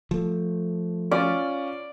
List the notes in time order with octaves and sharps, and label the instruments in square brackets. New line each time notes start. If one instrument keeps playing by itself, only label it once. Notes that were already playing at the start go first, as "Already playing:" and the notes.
[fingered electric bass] F3 A3
[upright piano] C#4 F4 [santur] D5